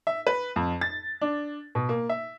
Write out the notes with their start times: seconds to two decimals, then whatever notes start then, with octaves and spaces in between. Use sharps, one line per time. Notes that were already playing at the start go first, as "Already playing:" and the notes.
0.07 E5
0.27 B4
0.56 F2
0.81 A6
1.21 D4
1.75 B2
1.89 A#3
2.09 E5